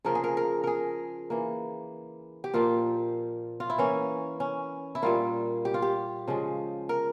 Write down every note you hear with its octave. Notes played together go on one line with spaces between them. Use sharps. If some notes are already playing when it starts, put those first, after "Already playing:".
C#3 F3 A#3 A#4
G#4
A#4
A#4
G#4 A#4
E3 A#3
G4
A#2 F3 A#3 F4
F4
E4
E3 A#3 C#4
C#4
E4
A#2 G3 A#3 F4
G4
F4
G4
C#3 F3 G#3
A#4